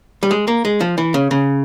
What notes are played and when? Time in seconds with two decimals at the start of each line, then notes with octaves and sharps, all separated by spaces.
0.23 G3
0.31 G#3
0.48 A#3
0.65 G#3
0.81 F3
0.98 E3
1.14 C#3
1.31 C#3